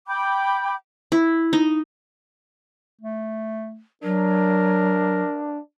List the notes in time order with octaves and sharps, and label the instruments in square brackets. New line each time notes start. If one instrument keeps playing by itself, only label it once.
[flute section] G5 B5 D6 G6
[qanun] E4
D#4
[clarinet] A3
[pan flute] F#3 [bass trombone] D4 [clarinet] A#4